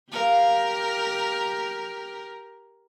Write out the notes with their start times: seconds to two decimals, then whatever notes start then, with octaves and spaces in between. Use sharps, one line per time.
0.12 F4 G4 A#4 F5